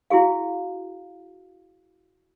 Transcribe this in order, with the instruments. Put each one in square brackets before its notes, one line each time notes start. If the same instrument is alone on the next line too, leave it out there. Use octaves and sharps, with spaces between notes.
[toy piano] E4 F#4 G#4 F5